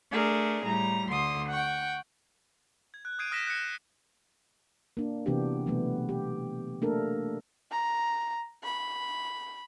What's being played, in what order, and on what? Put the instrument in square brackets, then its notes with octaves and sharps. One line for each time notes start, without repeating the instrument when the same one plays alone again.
[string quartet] A3 D4 G#4 A#4
A2 G3 A#5
D2 D3 C6 D#6
F#5 G5 C#6
[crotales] G#6
F#6
D#6 G6 G#6 C7 D7 D#7
D#6 F6 A#6 B6 E7
F#6 G#6 C#7 E7
[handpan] A#3 D4
C3 E3 B3 D4 F#4 G4
B2 E3 F#3 A3 B3
G4
A3 A#3 D4 A4 A#4
[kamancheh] A#5
B5